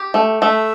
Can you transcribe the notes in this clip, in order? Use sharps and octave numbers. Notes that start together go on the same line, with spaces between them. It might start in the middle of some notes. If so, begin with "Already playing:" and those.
Already playing: G4
A3
A3 E5